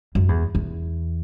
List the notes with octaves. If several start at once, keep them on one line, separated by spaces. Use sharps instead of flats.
F#2
E2
E2